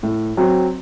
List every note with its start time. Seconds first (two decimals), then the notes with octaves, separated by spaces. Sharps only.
0.03 A2
0.37 F#3 C4 F#4